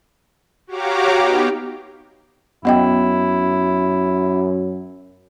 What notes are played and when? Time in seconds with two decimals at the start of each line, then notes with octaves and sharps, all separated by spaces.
0.67 F#4 G4 C#5 F5 A#5 D6
1.17 B3 D#4 G4
2.65 F#2 B3 E4 D#5 G5